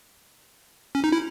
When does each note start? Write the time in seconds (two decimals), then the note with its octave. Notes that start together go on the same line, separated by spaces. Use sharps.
0.95 C#4
1.04 D#4
1.12 E4